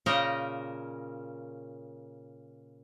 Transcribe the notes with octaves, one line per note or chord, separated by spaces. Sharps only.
A#2 C#3 A#4 D#5 G5